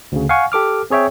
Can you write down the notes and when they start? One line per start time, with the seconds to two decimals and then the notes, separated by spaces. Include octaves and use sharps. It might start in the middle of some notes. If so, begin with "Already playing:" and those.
0.12 D2 C#3
0.29 F5 F#5 G#5 C#6
0.52 G4 A4 D6 F6
0.90 C4 G#4 C#5 E5 G5